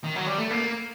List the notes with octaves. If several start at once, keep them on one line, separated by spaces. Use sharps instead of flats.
D#3
F#3
G3
A3
A#3